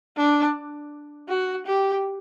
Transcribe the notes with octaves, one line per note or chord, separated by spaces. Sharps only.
D4
F#4
G4